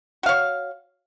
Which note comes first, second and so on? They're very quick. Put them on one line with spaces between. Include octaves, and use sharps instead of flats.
F#4 F5 C#5